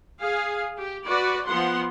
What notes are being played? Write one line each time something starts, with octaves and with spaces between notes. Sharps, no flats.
G#4 F5
G4
F#4 B4 D5
F3 B3 F#5 C6